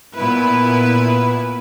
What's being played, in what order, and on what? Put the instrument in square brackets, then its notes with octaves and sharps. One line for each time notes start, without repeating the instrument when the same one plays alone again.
[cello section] A#2 B3 E4 B4